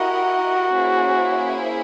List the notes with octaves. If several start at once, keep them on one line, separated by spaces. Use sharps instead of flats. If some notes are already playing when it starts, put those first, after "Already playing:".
Already playing: E4 F#4 G4 A#4 D#5 F#5
A#3 C#4 E4 G#4 C5